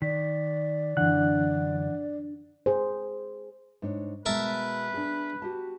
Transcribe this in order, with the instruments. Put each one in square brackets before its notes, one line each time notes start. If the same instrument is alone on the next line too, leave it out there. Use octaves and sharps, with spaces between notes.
[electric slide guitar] D#3 [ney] D5 [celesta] B6
[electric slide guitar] F#2 D3 [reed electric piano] E3 F#5 F#6 [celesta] D4
[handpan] G#4 C5
[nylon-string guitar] G#2 D4 C#5
[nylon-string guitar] B2 G#3 [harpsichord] A#4 E5 A5 [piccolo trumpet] B4
[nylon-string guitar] D4 G#4
F#4 G4 A5